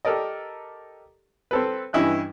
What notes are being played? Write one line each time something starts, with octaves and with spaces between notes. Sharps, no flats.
G4 A4 A#4 D5 D#5
C4 A4 B4
G2 E3 C#4 E4 D#5 F#6